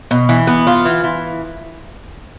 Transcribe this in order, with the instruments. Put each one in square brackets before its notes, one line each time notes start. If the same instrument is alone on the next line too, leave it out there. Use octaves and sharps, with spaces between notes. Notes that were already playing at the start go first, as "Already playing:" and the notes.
[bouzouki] B2
E3
B3
F4
E3
E3